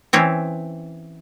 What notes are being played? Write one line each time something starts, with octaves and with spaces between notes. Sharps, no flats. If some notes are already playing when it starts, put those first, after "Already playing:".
E3 C4 C#4